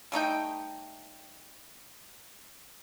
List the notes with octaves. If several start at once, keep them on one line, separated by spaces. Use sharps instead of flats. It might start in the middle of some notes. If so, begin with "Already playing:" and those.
G3 A3 D#4 G5